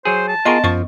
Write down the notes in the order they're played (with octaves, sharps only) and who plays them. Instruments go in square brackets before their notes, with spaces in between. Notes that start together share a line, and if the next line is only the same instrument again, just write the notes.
[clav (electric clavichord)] F#3 G#4 [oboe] C5
[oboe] A5
[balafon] B3 C6 C#6 [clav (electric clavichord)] F4 G#4 A#4 [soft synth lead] D#5
[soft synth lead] F#2 [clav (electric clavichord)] F3 [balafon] D#5 C#6